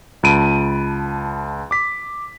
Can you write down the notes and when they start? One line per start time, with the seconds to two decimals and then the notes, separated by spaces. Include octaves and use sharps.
0.23 C#2 A5 B5 D7 D#7
1.71 D6 B6